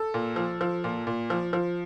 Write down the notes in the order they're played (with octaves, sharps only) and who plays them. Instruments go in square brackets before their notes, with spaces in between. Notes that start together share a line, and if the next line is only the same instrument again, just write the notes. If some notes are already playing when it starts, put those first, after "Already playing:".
Already playing: [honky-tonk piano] A4
A#2
F3
F3
A#2
A#2
F3
F3